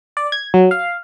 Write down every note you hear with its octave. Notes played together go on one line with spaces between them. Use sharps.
D5
G#6
F#3
F5